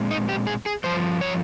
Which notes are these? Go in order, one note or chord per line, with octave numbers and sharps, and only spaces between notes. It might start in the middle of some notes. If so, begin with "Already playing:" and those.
Already playing: A#2 G#3 C4
D#4
G4
G#4
G#4
G2 F3 C5
C#5